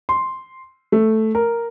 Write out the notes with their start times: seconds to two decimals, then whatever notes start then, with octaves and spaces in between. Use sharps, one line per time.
0.09 C6
0.92 A3
1.35 A#4